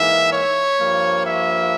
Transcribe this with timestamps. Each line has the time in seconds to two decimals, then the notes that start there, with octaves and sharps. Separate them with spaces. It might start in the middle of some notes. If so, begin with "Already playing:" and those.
Already playing: G#2 E3 A#3 E5
0.32 C#5
0.79 G2 F3 A#3
1.26 E5